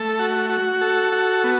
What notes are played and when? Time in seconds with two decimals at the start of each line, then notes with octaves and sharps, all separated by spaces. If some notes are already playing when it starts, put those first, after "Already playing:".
Already playing: A3 A4
0.19 F#4
0.50 F#4
0.81 A4
1.12 F#4
1.44 B3